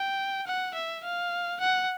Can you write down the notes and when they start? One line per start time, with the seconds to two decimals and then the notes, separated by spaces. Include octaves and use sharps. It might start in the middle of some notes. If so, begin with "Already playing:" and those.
Already playing: G5
0.47 F#5
0.74 E5
1.04 F5
1.60 F#5